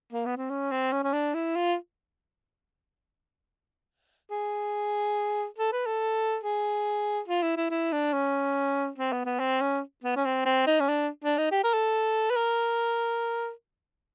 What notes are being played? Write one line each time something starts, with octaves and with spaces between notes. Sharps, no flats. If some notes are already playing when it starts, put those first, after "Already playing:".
A#3
B3
C4
C#4
C4
C#4
C#4
D4
E4
F4
G#4
A4
B4
A4
G#4
F4
E4
E4
E4
D4
C#4
C4
B3
B3
C4
C#4
B3
C#4
C4
C4
D#4
C#4
D4
D4
D#4
G4
A#4
A4
B4
A#4